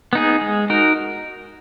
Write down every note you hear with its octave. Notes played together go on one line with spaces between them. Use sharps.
B3 D#4 G#4
G#3
D#4 F#4 A#4